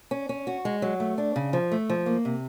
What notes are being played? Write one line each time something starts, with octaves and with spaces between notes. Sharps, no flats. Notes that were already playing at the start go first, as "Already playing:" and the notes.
C#4
C#4
F#4
G#3
F#3
A3
D4
C#3
F3
A3
F3
A#3
C3